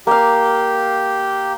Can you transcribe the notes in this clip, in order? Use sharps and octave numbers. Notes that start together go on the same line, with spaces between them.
A#3 G4 F5